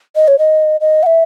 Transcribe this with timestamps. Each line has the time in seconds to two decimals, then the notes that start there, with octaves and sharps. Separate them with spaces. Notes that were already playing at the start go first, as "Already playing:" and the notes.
0.16 D#5
0.28 C#5
0.39 D#5
0.81 D#5
1.03 F#5
1.06 E5